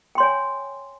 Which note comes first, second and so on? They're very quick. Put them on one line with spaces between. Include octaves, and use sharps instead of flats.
G5 C6 C#5 G#5